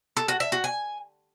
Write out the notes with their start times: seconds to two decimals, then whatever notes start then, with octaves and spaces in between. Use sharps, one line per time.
0.17 A4
0.28 F#4
0.40 E5
0.52 F#4
0.64 G#5